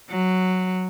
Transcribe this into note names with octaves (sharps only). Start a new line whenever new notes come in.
F#3